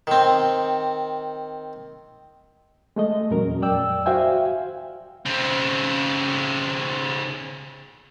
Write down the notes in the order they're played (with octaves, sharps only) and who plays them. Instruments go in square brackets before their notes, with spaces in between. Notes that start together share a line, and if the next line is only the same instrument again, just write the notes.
[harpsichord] D#3 C4
[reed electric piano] G#3 A3 D#5
E2 A#2 F#3 C#4 A#4
F2 D5 G5 E6
F#4 C5 E5 F5 G5 G#5
[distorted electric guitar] C#3 C4